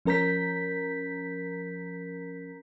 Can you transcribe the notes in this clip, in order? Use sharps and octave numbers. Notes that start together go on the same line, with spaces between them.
F3 C#4 A#4 A#5 G6 B6